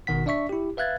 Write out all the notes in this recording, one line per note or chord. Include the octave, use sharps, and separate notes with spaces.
G#1 B2 D#3 F#5 B6
D4 D5 E5 C#6 B6
E4 G4
B4 E5 F5 F#6 G#6 A6